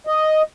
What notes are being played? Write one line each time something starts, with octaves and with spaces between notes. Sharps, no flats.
D#5